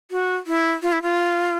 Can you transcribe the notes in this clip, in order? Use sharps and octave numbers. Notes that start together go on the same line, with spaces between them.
F#4
E4
F4
E4
F4